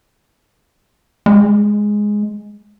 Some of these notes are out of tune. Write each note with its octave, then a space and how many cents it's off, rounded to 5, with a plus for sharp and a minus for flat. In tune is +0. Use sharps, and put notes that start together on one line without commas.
G#3 +0